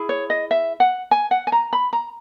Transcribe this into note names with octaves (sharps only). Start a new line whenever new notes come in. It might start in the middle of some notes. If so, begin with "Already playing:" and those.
Already playing: E4 G#4
C#5
D#5
E5
F#5
G#5
F#5
G#5
A#5
B5
A#5